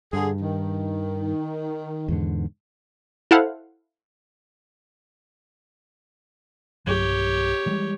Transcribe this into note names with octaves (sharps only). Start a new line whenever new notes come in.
G2 D3 G#4
D#3
E2 G#2 D3
E4 A4 C5 F5 F#5
B1 G2 F#3 G4 C#5
E3 G3 G#3